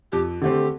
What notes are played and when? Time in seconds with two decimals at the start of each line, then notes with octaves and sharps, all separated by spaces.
0.12 F2 G4
0.41 D3 A3 C4 G4